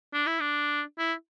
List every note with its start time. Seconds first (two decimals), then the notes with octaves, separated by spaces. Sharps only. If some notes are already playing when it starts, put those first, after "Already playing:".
0.13 D4
0.27 E4
0.40 D4
0.98 E4